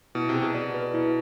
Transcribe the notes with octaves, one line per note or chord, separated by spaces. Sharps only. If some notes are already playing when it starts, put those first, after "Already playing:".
B2 E4
C3
G#4
B2
B2 D5
B4
B2 E4